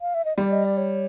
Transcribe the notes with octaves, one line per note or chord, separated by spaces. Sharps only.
F5
E5
D#5
G3 D5
D#5
D5
C#5